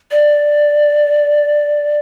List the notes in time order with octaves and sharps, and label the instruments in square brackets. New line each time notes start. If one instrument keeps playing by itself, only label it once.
[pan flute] D5